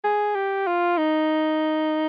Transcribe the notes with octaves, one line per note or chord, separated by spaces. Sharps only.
G#4
G4
F4
D#4